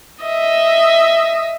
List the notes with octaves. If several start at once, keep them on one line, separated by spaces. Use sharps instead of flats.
D#5 E5